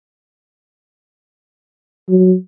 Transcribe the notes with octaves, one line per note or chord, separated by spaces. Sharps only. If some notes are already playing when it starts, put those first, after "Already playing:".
F#3